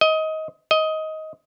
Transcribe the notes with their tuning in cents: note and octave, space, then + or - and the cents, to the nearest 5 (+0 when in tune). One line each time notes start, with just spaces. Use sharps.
D#5 +20
D#5 +15